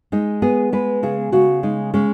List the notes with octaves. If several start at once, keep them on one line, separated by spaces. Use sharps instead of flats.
G#3 D#4
B3 G#4
G#3 B4
C#3 G#4
C#3 F#4
G#3 D#4
G#3 C#4